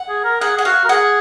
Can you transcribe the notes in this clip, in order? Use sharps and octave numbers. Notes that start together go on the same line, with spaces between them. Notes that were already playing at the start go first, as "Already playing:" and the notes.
Already playing: F#5
G#4
A#4
G#4 F#5
G#4 F#5
F#4 F5
A#4
G#4 F#5